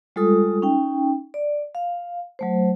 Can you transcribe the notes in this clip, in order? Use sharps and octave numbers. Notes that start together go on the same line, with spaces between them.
G3 G#3 F4 A4 D#6
C#4 D#4 G5
D5
F5
F#3 A3 C5